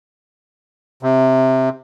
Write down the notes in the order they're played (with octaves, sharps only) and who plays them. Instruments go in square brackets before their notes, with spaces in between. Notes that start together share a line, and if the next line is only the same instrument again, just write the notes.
[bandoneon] C3